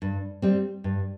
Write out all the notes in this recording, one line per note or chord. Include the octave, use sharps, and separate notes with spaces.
G2
G3 C4
G2